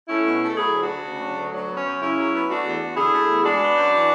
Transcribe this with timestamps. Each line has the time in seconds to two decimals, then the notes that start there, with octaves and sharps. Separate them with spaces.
0.08 A3 C#4 E4
0.25 B2
0.41 A3
0.48 A4
0.56 F#3 E4 G#4
0.72 D2
0.80 D4 F#4
0.89 D2
1.04 C#3
1.20 F#3
1.36 D2
1.52 F#3
1.68 B3
1.76 C#4
1.84 F#2
2.00 C#3 C#4 E4
2.16 F#3
2.33 B3
2.48 A3 D4 F#4
2.63 E2
2.80 E2
2.95 D3 E4 G#4
3.12 A3
3.28 E2
3.43 G#3 D4 F#4
3.60 B3
3.76 F#2
3.92 E3